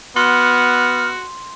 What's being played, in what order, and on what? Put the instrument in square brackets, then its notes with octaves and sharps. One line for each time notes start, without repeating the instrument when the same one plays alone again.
[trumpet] B3 [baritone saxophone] F#4 [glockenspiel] C6 [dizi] F6